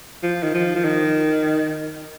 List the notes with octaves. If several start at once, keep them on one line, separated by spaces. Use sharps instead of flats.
F3
D#3
F3
F3
D#3